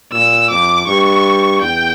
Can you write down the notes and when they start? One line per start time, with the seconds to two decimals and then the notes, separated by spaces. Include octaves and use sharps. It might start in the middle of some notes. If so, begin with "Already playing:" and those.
0.13 A#2 E6
0.50 F2 D6
0.87 G2 C#6
1.62 E2 G5